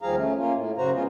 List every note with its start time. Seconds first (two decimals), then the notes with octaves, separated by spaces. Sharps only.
0.02 D#2 F3 G3 G#4 F5 A#5
0.17 A3 C#4
0.38 A#3 C#4 F4
0.55 A2
0.78 F#2 C#3 F#4 C5 A#5
0.94 G#3 B3 C#4 F4